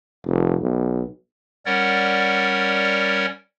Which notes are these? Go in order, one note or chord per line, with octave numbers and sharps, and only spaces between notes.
F1
B1
G3 C#4 A#4 C#5 D5 F#5